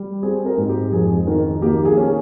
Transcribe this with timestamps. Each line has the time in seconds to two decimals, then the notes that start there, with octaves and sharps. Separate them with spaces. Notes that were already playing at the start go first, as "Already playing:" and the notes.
Already playing: G3
0.23 C4 G#4
0.46 A#4
0.57 G#2
0.69 G4
0.92 F2 G#4
1.27 D#3 A#4
1.62 A#3 G4
1.85 G#4
1.97 C#4